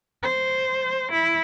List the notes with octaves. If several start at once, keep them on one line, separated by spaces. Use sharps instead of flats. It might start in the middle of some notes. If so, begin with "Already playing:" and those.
C5
E4